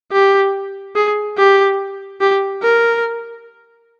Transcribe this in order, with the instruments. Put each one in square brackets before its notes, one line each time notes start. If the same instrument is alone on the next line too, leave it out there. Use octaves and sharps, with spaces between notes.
[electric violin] G4
G#4
G4
G4
A#4